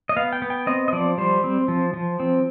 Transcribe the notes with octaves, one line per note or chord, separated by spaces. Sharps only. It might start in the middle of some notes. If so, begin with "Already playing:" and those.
D#5
B3 F5
G5
B3
G5
C4 D#5
D#5
F3 D5
G3 C5
C4
F3
F3
C4